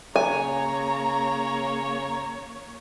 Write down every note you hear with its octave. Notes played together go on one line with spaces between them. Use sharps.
C#3 A#3 C#5 G#5 A#5